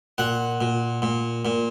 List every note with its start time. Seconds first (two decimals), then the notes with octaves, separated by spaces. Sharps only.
0.18 A#2 F#5
0.61 A#2
1.02 A#2
1.45 A#2